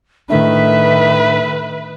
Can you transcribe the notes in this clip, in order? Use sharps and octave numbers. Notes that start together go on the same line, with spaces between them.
A2 D#3 A3 D4 B4 E5